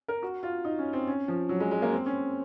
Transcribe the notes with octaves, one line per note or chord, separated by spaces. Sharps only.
A#4
F#4
F4
D#4
C#4
C4
C#4
F3
F#3
G#3
G#3
A#3
C4
C#4